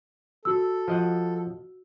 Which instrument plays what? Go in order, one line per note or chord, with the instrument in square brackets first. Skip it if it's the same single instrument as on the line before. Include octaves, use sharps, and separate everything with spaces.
[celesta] F#4 E6 [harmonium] A4
[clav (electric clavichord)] F3 D#5 F#5